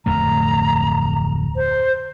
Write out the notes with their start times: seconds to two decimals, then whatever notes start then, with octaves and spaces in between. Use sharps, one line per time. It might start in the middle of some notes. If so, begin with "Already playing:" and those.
0.06 D1 F2 A3 A#5
1.56 C5